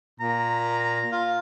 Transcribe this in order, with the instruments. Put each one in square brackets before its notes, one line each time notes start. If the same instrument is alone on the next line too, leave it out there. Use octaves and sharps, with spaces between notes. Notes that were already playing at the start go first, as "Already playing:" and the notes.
[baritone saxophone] A#2 [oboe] A#5
[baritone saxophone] F4